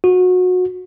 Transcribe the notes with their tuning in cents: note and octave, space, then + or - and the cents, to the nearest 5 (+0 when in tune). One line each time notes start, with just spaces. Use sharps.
F#4 -25